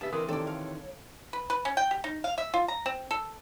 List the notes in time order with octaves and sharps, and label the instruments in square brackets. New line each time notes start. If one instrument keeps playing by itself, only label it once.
[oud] C#3 B3 [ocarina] G4 [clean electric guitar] E5 A5
[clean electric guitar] D3 E3 C4 [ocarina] A#4 [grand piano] D#6
[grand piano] C3 D#3 [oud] A4 D5 [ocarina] C#5
[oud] F5
[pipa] B4
B4
C#4
G5
G4
D#4
F5
E5
F4
A#5
C4
A4